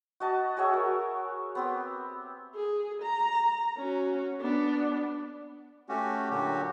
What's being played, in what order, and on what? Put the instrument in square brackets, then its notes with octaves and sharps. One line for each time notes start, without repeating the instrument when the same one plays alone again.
[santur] F#4 D#5 A5
F#4 G#4 C#5 E5
A#4
B3 C4 G4
[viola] G#4
A#5
C#4 F#4
B3 D4
[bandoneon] A3 C#4 F#4 G4
A#2 D3 F#3 F#4 G4